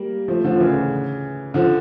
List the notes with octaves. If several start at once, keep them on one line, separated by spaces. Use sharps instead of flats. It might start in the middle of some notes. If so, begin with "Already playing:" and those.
Already playing: G3 A#3
F3 A3
D3 F3
F3
C#3 E3
D3 F3